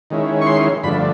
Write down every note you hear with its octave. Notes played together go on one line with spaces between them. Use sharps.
D#3 G#3 C#4 E4
C#6
C6
G2 D3 F3 A3 D4 B5